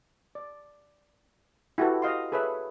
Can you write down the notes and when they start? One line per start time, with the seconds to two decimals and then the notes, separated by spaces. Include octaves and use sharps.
0.35 D5
1.78 E4 F#4 G4 A4 B4
2.02 D#5 F5 C6
2.32 G#4 A4 B4 C#5 E5